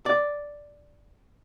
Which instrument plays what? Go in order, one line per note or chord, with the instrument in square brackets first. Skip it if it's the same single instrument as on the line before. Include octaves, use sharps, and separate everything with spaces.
[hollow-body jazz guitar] D5